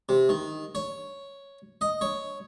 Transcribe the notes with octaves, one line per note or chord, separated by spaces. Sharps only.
C3
D#3
C#5
D#5
C#5